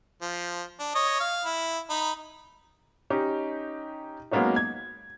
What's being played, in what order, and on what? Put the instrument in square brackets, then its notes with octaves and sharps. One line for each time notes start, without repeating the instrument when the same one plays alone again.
[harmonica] F3
D4
C#5 D#5
F5
E4
D#4 B5
[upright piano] C#4 D#4 G4
F#3 G#3 A#3 B3 C#4 D#4
G#6